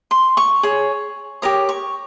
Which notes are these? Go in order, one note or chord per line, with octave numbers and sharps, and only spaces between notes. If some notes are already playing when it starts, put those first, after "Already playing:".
C6
C#6
G#4 C#5
G4 A#4 C#5 D#6
C#6